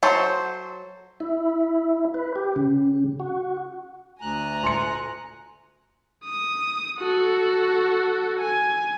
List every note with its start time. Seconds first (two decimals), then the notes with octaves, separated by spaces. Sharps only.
0.03 F#3 A4 C5
1.20 E4
2.14 B4
2.36 G4
2.56 C#3
3.20 F#4
4.22 D2 G#5 A#5 F#6
4.64 C6 C#7
6.24 D#6
6.99 F#4 A4
8.39 G#5